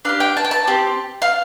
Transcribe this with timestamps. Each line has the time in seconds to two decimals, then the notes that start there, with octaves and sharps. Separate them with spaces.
0.05 D4 G4 F5
0.20 G5
0.37 A5
0.45 G5
0.51 A5
0.67 C4 G4
1.22 F5